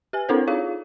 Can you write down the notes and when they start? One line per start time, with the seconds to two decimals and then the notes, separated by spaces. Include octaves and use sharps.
0.13 G4 B4 G#5
0.29 C4 D4 E4 A4 A#4 C5
0.48 D#4 F4 G#4 C#5 F5